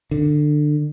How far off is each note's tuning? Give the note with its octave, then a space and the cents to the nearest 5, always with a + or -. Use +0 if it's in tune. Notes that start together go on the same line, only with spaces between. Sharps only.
D3 +20